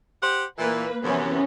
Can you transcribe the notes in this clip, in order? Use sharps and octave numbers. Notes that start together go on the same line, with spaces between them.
G4 C5 F#5
A#2 E3 A#3 B4
F#2 C3 E3 B3 C#4